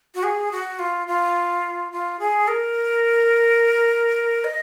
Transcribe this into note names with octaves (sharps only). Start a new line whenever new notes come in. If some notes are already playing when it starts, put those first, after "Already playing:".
F#4
G#4
F#4
F4
F4
F4
G#4
A#4
D#5